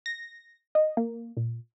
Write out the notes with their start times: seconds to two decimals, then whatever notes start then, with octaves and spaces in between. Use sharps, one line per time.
0.06 A#6
0.75 D#5
0.97 A#3
1.37 A#2